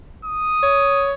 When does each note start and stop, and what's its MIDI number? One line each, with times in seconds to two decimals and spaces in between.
0.25 1.13 87
0.63 1.13 73